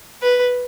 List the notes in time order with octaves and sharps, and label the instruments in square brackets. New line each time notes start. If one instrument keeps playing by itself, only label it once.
[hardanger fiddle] B4